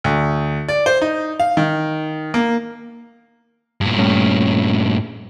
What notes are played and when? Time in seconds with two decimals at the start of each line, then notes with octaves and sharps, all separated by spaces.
0.04 D2
0.69 D5
0.86 C5
1.02 D#4
1.40 F5
1.57 D#3
2.34 A#3
3.81 G2 A#2
3.98 G3 A3 C#4